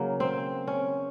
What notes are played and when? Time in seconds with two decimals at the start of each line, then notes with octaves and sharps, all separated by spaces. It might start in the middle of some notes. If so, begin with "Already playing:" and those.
Already playing: C#3 F#3 A#3
0.20 C4
0.67 C#4